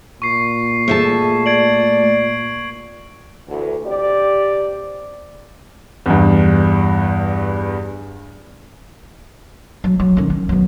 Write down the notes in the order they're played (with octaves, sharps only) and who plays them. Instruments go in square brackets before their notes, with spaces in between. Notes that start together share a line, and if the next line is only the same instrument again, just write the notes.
[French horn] A#2 [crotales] C#6 C7
[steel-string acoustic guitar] A3 E5 A5 [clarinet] G#4
[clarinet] D5 [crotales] G#6 D7 F#7
[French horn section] D2 E3
C3 G4 D5
[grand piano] E2 G2
[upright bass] F#3
F#3
D#3 C#4
C#4
F#3 B3